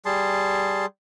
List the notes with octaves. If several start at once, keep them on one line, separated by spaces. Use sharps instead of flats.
G3 G#4 A5 C6